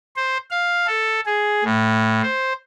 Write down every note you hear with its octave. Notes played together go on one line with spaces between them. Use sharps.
C5
F5
A4
G#4
A2
C5